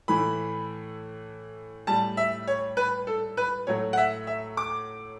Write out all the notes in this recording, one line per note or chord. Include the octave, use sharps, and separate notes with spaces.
A2 E3 A3 B5
A2 G3 A5
E5
C#5
B4
A4
B4
A2 F#3 A3 C#5
F#5
E5
E5
D6